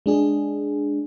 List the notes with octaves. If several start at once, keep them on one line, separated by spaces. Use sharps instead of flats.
G#3 D4 G#4